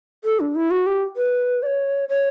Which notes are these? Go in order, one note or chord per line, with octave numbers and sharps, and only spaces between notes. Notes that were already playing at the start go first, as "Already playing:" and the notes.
A4
D4
E4
F#4
G4
B4
D5
C#5
C#5